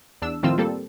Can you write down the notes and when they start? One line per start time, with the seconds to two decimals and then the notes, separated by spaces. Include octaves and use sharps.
0.22 E2 D4 E6
0.43 A2 D#3 F3 C4 F4 E6
0.58 G3 A#3 C4 A4